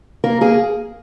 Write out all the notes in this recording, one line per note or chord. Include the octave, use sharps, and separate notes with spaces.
A#3 A#4
A#3 G#4